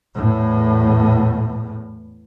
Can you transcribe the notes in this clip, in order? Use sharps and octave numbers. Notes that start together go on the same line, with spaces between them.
E2 A2